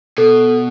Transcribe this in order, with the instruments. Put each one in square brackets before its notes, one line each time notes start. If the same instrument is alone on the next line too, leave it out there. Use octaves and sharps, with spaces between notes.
[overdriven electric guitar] B2 [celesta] A4